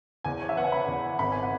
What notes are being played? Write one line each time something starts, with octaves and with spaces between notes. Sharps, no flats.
E2 G#5
C#5
E5
B3 F#5
G#5
B5
E2
G#1 B5
G#5
F#5